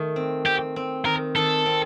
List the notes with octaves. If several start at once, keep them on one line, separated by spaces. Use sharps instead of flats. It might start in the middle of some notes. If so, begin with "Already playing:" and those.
Already playing: D#3 A3
C4
C4 G4
C4
D#3 A#4
D#3 A4
C4